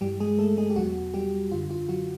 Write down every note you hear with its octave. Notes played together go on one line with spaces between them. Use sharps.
G2 E3 G3 G4
G#3 G#4
A3 A4
G#3 G#4
G4
E2 B2 F#3 F#4
G3 G4
F#2 D3 F4
F4
F#3 F#4